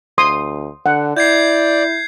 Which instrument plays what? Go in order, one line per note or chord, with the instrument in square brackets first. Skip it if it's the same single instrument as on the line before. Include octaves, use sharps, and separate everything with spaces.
[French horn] D2 [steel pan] C6 D#6
[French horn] D3 [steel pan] F#5
[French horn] E4 [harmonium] D5 [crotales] G6 G#6 C7